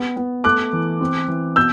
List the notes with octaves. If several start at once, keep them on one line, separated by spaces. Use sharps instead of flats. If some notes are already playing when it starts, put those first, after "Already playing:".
Already playing: B3
B3
A3 D6 F#6
E3
C4
E3
B2 E6 G6